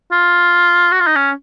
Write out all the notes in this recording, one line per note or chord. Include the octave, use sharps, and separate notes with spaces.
F4
F#4
F4
D#4
C#4